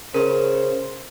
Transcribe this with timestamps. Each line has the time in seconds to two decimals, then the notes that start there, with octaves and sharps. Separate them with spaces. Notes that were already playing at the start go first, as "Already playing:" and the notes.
0.14 C#3 A#4 C5